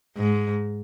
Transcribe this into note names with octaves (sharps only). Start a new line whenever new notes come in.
G#2